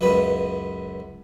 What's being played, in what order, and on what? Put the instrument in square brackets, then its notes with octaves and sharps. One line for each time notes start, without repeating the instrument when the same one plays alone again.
[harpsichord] C#2 F#2 B3 B4